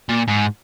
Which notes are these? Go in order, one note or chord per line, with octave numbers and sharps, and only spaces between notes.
A#2
G#2